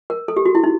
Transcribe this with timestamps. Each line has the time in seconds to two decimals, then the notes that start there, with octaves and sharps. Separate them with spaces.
0.10 A#4
0.28 A4
0.37 G4
0.45 F#4
0.55 E4
0.64 D#4